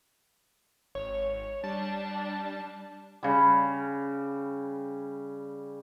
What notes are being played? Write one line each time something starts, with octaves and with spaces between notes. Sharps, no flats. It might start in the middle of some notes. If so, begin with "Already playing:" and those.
G#1 C#5
G3 D4 A5
C#3 G3